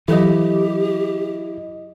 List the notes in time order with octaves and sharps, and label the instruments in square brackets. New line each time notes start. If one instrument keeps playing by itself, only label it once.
[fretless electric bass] E3 [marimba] F#3 A4 [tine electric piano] E4 D#5 [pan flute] G4